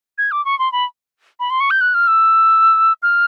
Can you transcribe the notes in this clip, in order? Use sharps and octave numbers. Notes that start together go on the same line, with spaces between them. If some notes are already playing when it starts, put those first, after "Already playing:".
G#6
D6
C#6
C6
B5
B5
C6
C#6
G6
F#6
F6
E6
F6